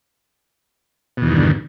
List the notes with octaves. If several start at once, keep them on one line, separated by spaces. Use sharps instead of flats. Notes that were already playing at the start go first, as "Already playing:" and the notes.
E2 G2 B2 D3 D#3